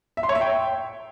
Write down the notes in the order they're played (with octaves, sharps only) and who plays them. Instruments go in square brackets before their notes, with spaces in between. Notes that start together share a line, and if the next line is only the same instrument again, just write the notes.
[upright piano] E5
C6
C#5
E5
G5